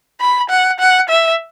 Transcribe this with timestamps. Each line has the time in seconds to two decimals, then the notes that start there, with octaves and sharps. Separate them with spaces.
0.20 B5
0.50 F#5
0.80 F#5
1.09 E5